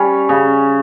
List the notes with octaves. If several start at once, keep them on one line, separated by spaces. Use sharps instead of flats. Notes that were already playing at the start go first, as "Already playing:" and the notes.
Already playing: G3 C#4
C#3